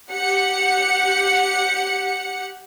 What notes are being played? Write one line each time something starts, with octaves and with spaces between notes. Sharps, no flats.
G4 F#5 C#7